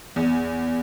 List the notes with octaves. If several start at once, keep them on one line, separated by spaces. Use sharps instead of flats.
E2